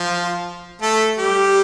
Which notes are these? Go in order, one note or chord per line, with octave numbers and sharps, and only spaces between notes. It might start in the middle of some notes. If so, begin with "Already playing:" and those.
Already playing: F3 F4
A3 A4
G3 G4